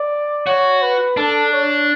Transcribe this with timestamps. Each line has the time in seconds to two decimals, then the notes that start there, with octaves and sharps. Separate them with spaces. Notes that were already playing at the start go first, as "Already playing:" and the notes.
Already playing: D5
0.46 F#4 C#5
0.82 B4
1.17 D4 A4
1.53 C#5